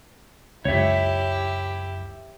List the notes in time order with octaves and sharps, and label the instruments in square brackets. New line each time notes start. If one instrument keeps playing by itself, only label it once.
[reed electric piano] C#2 F#2 [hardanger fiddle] E4 G4 [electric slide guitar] C#5 E5